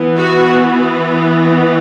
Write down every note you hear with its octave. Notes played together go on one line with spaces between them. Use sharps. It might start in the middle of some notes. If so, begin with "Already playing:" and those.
Already playing: E3 B3
F#4